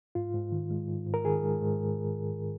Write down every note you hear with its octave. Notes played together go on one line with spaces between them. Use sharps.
G#2 F4
G#2
D#3
G#3
G#2
G#2
A#4
D#3 G#4
G#3
G#2
G#2